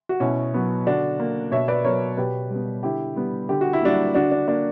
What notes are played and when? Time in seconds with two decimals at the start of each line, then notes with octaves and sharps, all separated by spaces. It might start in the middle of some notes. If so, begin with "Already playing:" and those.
0.09 F#4
0.20 B2 C#4 E4
0.54 F#3 B3
0.86 D3 D4 F#4
1.20 A#3
1.52 B2 C#5 E5
1.68 B4 D5
1.84 F#3 B3 A#4 C#5
2.17 B2 G4 B4
2.50 G3 B3
2.83 D3 E4 G4
3.16 G3 B3
3.49 D3 G4
3.61 F#4
3.73 E4
3.82 G3 A#3 D4 F#4
4.15 D3 D4 F#4
4.31 D4
4.48 A#3 D4